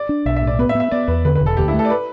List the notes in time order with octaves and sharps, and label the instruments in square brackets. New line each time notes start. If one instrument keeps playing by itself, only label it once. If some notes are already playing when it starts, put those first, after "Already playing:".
Already playing: [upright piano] D5
[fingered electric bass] D4
[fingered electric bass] B1 [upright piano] E5
[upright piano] E5
[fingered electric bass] A2
[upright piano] D5
[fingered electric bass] B3 [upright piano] B4
[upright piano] E5
[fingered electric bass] B3
[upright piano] E5
[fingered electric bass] B3 [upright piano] D5
[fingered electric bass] E2 [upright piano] B4
[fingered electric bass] D3 [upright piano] B4
[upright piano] B4
[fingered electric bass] E1
[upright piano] A4
[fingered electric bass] D2 [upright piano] G4
[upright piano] E4
[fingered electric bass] A3
[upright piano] A4
D5
B4